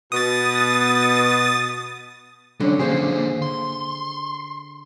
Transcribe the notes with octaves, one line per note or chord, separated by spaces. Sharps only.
B2 D#6 A6
D3 F#3 G#3 C#4
D3 A#3 G#4 C5 F5
C6